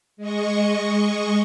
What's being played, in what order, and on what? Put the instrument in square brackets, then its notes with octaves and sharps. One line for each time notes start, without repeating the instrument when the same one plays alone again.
[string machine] G#3 D#5 C#6